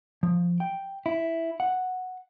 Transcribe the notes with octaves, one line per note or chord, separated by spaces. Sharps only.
F3
G5
E4
F#5